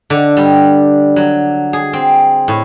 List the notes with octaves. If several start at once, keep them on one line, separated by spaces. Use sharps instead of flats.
D3
G3
F#3
G#4
C4
A2